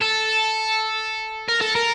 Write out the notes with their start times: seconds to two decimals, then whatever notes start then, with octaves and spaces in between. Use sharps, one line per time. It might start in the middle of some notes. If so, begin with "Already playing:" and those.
0.02 A4
1.49 A#4
1.61 A4
1.75 A#4